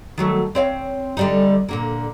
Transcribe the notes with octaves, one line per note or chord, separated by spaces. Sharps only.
D#3 F#3 A3
C4 C#5 F5
D3 G3 D#4
A#2 D3 A#3